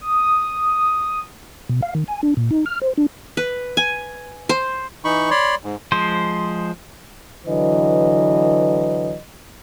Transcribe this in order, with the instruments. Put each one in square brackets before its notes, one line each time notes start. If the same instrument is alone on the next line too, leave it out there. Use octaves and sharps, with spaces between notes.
[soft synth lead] D#6
[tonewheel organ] B2
F5
D#3
G#5
D4
A#2
D#4
F6
C5
D4
[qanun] B4
G#5
C5
[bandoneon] E3 D#4 B5 C#6
C#5 D5 B5 C6
G#2
[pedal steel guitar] F3 G#3 C5
[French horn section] D3 E3 F#3 B4 D#5